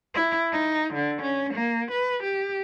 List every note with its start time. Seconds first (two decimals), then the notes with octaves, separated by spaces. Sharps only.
0.14 E4
0.52 D#4
0.94 D3
1.22 C#4
1.54 A#3
1.92 B4
2.24 G4